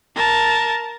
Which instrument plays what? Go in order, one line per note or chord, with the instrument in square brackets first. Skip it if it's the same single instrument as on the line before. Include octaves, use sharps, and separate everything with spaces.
[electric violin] A#4 A5